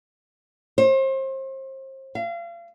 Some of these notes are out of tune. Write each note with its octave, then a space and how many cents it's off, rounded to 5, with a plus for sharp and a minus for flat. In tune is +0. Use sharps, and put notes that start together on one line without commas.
C5 +35
F5 -35